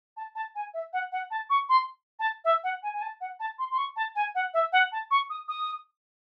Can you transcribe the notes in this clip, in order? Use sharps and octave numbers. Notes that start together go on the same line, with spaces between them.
A5
A5
G#5
E5
F#5
F#5
A5
C#6
C6
A5
E5
F#5
G#5
G#5
A5
F#5
A5
C6
C6
C#6
A5
G#5
F#5
E5
F#5
A5
C#6
D#6
D#6